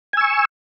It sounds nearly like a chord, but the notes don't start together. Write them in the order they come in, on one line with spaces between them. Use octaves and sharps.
G#5 E6 C#6